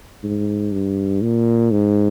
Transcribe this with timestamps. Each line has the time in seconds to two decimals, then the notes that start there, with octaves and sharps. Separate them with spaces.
0.23 G#2
0.72 G2
1.22 A#2
1.71 G#2